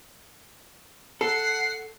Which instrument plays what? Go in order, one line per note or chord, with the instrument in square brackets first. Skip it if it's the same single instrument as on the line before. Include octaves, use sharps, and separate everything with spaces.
[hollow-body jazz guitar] A4 [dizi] F#5 [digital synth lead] C7